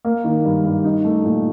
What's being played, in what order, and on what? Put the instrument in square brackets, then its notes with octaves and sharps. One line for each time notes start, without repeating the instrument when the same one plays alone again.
[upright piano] A#3
D#3
G2
G2
D#4
A3
A#2